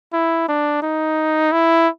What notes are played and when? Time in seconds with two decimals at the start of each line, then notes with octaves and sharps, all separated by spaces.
0.13 E4
0.49 D4
0.82 D#4
1.52 E4